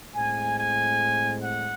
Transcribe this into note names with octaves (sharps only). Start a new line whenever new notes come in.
A2 G#3 C4 G#5
G#5
F#5